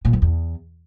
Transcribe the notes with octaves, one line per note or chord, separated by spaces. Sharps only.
A#2
F2
E2